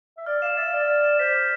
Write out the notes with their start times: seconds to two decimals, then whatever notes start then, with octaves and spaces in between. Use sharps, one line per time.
0.17 E5
0.26 D5 F6
0.42 F5 E7
0.57 E5 A6
0.73 D5 F6
0.88 F6
1.04 E7
1.19 C5 B6
1.35 F6